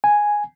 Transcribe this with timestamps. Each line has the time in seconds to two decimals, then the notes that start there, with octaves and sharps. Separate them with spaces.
0.04 G#5